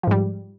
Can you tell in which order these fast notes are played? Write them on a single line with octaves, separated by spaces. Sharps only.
F3 G#2 G3